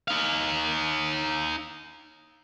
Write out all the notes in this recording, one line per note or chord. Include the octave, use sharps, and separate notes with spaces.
D#4 F5